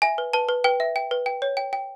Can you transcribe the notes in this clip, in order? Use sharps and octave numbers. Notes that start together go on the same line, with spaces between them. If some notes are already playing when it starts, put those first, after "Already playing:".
E5 G#5
B4
B4 A5
B4
B4 G5
E5
G5
B4
G5
C#5
G5
G5